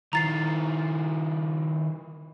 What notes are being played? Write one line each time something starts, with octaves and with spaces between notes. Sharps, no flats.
D#3 F3 A#5 A6 C7